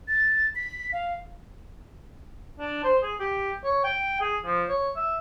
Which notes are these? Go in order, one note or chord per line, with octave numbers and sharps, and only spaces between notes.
A6
B6
F5
D4
C5
G#4
G4
C#5
G5
G#4
F3
C#5
E5